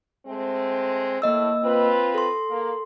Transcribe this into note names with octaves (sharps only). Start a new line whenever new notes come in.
G#3 A3 C4
A2 A#3 D#5 E6
C4 F4 B4
A4 C6
A#3